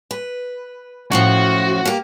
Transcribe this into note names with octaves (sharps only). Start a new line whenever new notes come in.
B4
F#2 A2 F3 F#4
A#3 G4